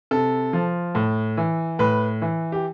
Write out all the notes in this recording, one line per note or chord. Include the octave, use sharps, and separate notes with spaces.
C3 A4
F3
A2
E3
A2 B4
E3
G4